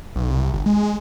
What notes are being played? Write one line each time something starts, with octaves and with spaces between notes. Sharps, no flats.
B1
C2
G1
G#3
G#3